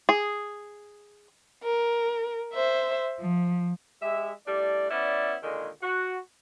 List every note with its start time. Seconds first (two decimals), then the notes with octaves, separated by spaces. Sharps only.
0.09 G#4
1.65 A#4
2.54 C5 E5
3.20 F3
4.02 G#3 G4 E5
4.47 A2 G3 D4 D5
4.91 B3 C#4 E4 D5
5.43 A#2 D3 D#3 G#3
5.82 F#4